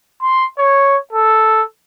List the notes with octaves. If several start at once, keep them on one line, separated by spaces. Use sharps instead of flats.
C6
C#5
A4